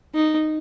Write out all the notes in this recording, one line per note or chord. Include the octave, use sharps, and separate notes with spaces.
D#4